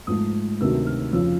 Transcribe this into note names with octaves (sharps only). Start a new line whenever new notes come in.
G#2 F3 A3 D#6
D2 C3 D#3 F#3 A3 E6
F6
F2 C#3 F3 E6